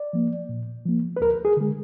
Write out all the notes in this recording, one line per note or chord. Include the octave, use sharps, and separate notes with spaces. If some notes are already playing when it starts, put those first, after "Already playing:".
Already playing: D5
F3 A#3
A#2
F3 A#3
B4
D2 A#4
G#4
D3 G#3